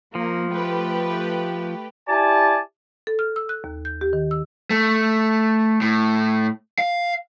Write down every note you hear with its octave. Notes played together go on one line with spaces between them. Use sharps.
F3 A#3
A3 G4 B4
E4 G4 D5 G#5 A5
A4
F6
E6
F#6
D#2
G6
G4
D#3
E6
A3
A2
F5